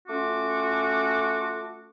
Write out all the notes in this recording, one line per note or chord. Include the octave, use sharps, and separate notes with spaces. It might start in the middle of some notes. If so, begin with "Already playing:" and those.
A3 C#4 F4 F#4 D6